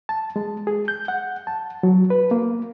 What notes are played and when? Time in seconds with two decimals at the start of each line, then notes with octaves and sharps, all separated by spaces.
0.09 A5
0.36 G#3
0.67 G#4
0.88 G6
1.08 F#5
1.47 A5
1.83 F#3
2.10 B4
2.31 A#3